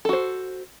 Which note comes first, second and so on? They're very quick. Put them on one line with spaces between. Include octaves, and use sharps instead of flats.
A4 F#4 C5